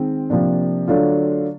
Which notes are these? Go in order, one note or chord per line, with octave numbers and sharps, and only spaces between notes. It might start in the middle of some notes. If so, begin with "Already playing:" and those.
Already playing: D#3 G#3 C4
C3 F3 A#3 D4
D3 F#3 A3 D4 F4